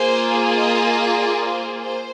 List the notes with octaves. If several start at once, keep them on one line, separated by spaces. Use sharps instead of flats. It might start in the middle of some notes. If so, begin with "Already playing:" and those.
Already playing: A#3 F4 G#4 C5
D#5
D5
C5
C5